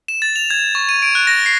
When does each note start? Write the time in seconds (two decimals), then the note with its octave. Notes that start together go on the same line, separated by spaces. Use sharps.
0.08 E7
0.22 A6
0.36 F7
0.50 G#6
0.75 C#6
0.89 D#7
1.02 D7
1.15 F#6
1.27 A#6
1.46 C7